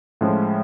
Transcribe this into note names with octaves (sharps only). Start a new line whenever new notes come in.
A2 F3 G#3 C#4